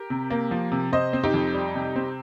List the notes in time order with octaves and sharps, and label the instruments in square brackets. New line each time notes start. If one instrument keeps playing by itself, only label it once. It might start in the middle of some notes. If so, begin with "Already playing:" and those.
Already playing: [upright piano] G4 A#4
C3
A#3
F3
C3
C3 C5 D#5
C4
D#4 G4
F2
G3
C3
C4